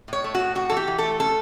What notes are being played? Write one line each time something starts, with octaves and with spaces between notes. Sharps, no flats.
A2 C#5
A3
A2 F#4
A2 F#4
E3 A4
G4
E3
A3 A4
C#4 A4